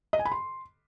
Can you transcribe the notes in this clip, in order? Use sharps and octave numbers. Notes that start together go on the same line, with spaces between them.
D#5
G#5
B5
C6